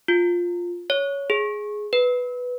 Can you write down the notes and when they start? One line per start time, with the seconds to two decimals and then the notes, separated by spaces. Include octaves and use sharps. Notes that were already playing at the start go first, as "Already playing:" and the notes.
0.08 F4
0.90 C#5
1.30 G#4
1.93 B4